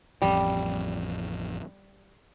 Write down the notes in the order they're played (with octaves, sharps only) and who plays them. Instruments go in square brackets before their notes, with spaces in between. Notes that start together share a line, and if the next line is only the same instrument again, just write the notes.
[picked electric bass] A1 F2 [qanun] G3